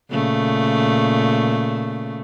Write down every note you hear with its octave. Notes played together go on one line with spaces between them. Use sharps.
A#2 C#3 A3